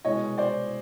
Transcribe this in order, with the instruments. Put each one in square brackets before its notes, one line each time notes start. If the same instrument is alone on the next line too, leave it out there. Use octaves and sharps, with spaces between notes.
[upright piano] C2 B2 G#3 C#5 D#5
C5 D5